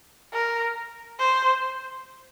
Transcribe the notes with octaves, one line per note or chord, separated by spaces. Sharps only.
A#4
C5